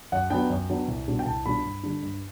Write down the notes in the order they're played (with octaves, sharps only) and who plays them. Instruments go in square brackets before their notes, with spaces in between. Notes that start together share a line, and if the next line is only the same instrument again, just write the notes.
[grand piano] F#2 F#5
F#3 B3 D4 G5
F#2
F#3 B3 D4
C2
B2 G3 D4
G5
C2 A5
B2 G3 D4 B5
G2
D3 G3 D4
G2